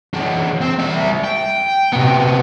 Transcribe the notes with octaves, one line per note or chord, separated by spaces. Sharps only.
E3 D4
C4
G3 E5
G5
C3 B3